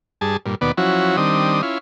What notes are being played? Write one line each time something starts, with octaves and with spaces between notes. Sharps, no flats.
G2 G#4 A5
G2 A#2
D#2 B2 B3 D5
F3 F#3 C#4 E4 F#4
D#3 G3 C4 D4 D#6
C#4 E4 F4